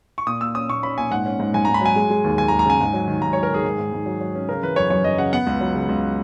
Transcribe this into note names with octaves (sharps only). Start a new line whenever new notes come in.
C#6
A#2 D#6
A#3 E6
C#4 D#6
A#2 C#6
C#4 B5
A#2 G#5
G#2 F#5
C#4
G#2
G#2 G#5
A#5
G#2
B5
F#3 G#5
G#3
G#3
D#2
D#2 G#5
A#5
G#3
A#5
C#3 G#5
G#2
F#3
D#3
G#2 A#5
C#5
F#3
A#4
D#3 G#4
G#2
G#2
G#2
F#3
F#3
C#4
C#3 A#4
E3 B4
F#2 C#5
F#2 C#5
F#2 D#5
C#3 F#5
B3 F#5
C#2
F#3
C#3
C#2